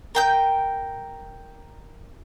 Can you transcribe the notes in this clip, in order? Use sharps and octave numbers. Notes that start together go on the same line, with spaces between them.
A#4 G5 G6